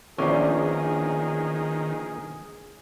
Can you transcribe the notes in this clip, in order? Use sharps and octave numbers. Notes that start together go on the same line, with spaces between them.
A#1 E2 D#3 C#4 D4 G#4 C5